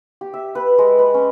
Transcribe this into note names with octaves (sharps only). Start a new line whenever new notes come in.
G4
E5
B4
G#3
B4
C#4